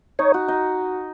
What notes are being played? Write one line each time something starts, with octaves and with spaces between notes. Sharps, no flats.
D#4 C#5
F#4
D#4